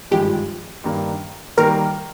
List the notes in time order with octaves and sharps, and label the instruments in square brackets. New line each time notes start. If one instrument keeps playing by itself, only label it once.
[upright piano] G#1 G2 F3 G#3 [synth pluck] G4
[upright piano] G2 D#3 A#3 D4
[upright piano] D#3 G3 A#3 [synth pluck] A#4